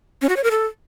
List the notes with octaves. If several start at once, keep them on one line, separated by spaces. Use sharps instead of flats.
C#4
F#4
C#5
A#4
A4